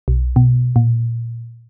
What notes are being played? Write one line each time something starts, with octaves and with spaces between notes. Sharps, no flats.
B1
B2
A#2